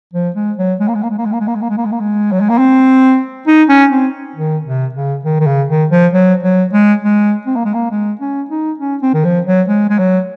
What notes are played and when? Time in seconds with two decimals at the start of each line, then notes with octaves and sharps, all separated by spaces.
0.14 F3
0.36 G#3
0.58 F#3
0.80 G#3
0.88 A#3
0.95 G#3
1.03 A#3
1.10 G#3
1.18 A#3
1.25 G#3
1.33 A#3
1.40 G#3
1.48 A#3
1.55 G#3
1.62 A#3
1.70 G#3
1.78 A#3
1.85 G#3
1.92 A#3
2.00 G#3
2.32 F#3
2.40 G#3
2.49 A#3
2.58 C4
3.47 D#4
3.69 C#4
3.91 C4
4.36 D#3
4.66 C3
4.95 C#3
5.25 D#3
5.40 D#3
5.47 C#3
5.69 D#3
5.91 F3
6.13 F#3
6.43 F#3
6.73 G#3
7.03 G#3
7.47 C4
7.56 A#3
7.65 G#3
7.74 A#3
7.91 G#3
8.21 C#4
8.51 D#4
8.80 C#4
9.02 C4
9.14 D#3
9.25 F3
9.47 F#3
9.69 G#3
9.90 G#3
9.99 F#3